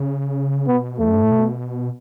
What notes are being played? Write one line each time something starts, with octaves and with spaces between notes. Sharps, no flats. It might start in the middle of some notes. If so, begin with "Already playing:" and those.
Already playing: C#3
B2 B3
E2 A3
F#2
G2
A2
B2